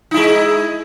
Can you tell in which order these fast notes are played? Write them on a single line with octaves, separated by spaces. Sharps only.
D#4 E4 G#3